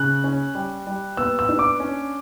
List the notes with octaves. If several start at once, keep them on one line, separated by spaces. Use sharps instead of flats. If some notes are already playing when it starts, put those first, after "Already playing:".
Already playing: C#3 F#6
C#4
G3
G3
B3 E6
E6
D4
D6
C#4